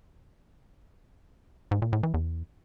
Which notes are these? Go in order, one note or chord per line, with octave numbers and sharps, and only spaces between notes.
G#2
A#2
A2
E3
E2